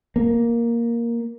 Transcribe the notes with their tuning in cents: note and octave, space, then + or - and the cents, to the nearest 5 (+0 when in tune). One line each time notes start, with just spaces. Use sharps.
A#3 +5